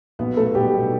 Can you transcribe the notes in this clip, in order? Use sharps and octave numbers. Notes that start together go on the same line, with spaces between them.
B1 B3 B4
A3 A4
B1 G3 G4
B2